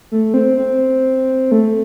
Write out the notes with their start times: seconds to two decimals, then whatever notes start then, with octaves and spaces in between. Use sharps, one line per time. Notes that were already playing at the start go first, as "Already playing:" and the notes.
0.12 A3
0.34 C4
0.57 C4
1.52 A3